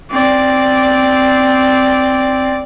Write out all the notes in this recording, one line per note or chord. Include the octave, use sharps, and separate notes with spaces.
C4 D5